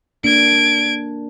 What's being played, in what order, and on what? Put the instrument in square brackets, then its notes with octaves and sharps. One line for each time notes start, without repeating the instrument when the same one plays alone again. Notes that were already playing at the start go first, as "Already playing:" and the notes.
[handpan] A#3 D4 [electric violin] G#6 D7